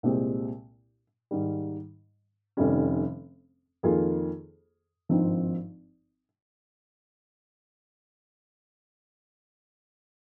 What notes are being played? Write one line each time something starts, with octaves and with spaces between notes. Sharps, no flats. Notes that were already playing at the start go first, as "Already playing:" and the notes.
C2 A#2 G#3 C4 G4
G#2 D#3 G3
F1 F2 D#3 G3 C#4
F2 D#3 A#3 F4 G#4
G#1 G2 F3 C4 D#4